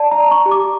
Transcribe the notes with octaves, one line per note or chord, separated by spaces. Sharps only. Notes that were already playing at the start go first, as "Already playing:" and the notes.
Already playing: D5 A5
A#5
D5
A#5
C#6
G4
D6